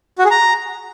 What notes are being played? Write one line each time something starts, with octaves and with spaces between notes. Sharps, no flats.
F#4
G#4
A#5